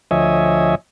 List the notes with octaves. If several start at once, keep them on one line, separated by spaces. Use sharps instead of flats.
D2 F3 C#5 D#5 E5 G#5